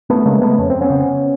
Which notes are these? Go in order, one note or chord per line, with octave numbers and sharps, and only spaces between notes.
A3 B3
C#3 G#3 A#3
A3 B3
F2 C#4
C4
B3 C#4
C#3